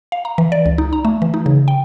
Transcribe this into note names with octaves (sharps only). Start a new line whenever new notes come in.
F5
A#5
E3
D5
C#2
D#4
A#5
A3
E3
D#4
C#3
G5